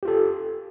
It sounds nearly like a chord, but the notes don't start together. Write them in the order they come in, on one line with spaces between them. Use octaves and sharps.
G4 F4 A4